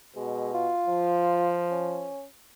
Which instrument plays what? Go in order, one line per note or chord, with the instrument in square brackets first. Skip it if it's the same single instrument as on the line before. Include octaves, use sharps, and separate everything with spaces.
[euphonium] B2 [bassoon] G#3
[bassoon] F4
[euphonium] F3
[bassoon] C#4